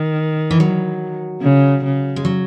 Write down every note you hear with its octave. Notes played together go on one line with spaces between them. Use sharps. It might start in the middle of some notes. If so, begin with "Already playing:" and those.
Already playing: D#3
E3
F#3
C#3
C#3
G#3
F#3